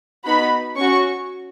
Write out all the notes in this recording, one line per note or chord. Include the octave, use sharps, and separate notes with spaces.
B3 D#4 F#4 B5
C#4 F#4 C#6